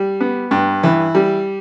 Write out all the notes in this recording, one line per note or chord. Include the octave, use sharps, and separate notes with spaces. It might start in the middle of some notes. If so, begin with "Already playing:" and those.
Already playing: G3
B3
G2
E3
G3